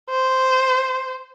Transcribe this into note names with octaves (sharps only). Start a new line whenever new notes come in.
C5